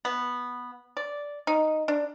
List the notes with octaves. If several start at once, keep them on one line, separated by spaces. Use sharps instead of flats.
B3
D5
D#4
D4